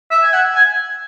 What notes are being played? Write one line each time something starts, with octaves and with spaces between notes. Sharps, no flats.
E5
G#5
F#5
G#5